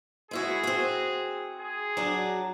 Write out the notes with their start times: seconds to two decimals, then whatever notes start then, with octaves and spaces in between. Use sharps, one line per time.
0.31 G#3 E4 F#4 G#4
0.64 C4 F#4
1.61 G#4
1.97 F#3 D4 F#4